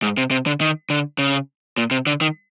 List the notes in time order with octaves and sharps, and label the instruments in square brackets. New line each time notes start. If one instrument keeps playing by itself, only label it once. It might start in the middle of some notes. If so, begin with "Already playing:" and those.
[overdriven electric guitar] G#2
C3
C3
D3
D#3
D3
C#3
A#2
C3
D3
D#3